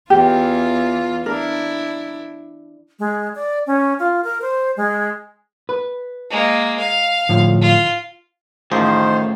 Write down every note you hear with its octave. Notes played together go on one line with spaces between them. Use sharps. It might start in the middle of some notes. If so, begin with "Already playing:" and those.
E2 E3 F4 G4
D4 E4 A#4
G#3
D5
C#4
F4
A#4
C5
G#3
B4
G#3 A#3
F5
A2 D3 F3
F4
A1 A2 D#3 F3 G#4 C5